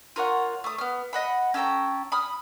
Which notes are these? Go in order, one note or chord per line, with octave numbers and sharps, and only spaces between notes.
F4 A#4 C#5 F#5
A3 D#6
B3 F6
D#5 F#5 B5
C#4 A4 G5 A#5
B5 D#6 F6